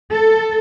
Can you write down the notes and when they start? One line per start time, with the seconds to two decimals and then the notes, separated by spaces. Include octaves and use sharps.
0.11 A4